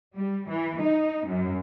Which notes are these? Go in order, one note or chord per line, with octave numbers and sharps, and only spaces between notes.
G3
E3
D#4
F#2